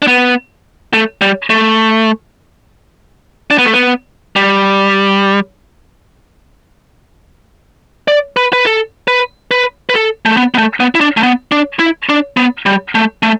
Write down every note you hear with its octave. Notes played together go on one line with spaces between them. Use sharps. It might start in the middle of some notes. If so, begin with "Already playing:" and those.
D4
B3
A3
G3
A3
D4
B3
A3
B3
G3
D5
B4
B4
A4
B4
B4
B4
A4
A3
B3
B3
A3
B3
E4
D4
A3
B3
D4
E4
D4
B3
G3
A3
A3